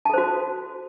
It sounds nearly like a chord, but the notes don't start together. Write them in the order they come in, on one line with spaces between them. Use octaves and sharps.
A5 A4 C5 F#4